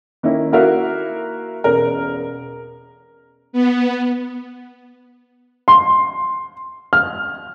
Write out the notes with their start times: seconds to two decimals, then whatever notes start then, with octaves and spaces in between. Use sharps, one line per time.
0.23 D#3 A#3 C#4 E4
0.52 A#3 E4 F#4 A#4 E5 F5
1.64 E1 C#4 A#4
3.53 B3
5.68 C6
6.93 F6